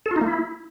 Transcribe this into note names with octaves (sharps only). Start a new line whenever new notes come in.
A4
F4
D#4
A#3
E4